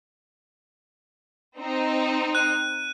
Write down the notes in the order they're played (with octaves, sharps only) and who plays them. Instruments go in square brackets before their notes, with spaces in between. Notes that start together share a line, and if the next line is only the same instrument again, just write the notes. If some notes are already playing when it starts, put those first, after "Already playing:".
[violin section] C4 D#4
[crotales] F#6 D#7